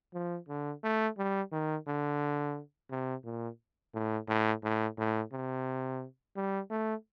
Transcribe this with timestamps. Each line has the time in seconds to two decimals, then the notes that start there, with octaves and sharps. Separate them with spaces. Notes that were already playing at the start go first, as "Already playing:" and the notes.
0.14 F3
0.49 D3
0.84 A3
1.18 G3
1.52 D#3
1.87 D3
2.91 C3
3.24 A#2
3.94 A2
4.28 A2
4.63 A2
4.98 A2
5.32 C3
6.36 G3
6.70 A3